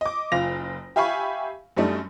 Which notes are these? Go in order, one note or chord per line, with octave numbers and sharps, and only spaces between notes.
D#5 D6
F#1 F4 A#6 F7
G4 E5 F5 G#5 B5 C#6
F#2 G3 A3 D4 D#4